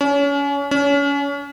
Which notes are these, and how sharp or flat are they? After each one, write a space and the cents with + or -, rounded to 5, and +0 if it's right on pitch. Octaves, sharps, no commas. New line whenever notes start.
C#4 +30
C#4 +30